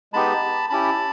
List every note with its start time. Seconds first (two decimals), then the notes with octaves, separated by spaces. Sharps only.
0.13 G#3 B3 D#4 G4 A5 B5
0.70 C#4 E4 G4 A5 B5